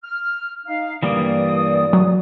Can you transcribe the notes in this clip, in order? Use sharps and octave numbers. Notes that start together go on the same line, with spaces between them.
F6
D#4 F5
G2 E3 G3 A#3 D5 D#6
F#3